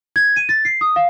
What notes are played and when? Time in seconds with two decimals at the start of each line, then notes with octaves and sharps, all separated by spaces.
0.16 G#6
0.36 D#7
0.49 A6
0.65 C7
0.81 D#6
0.96 F5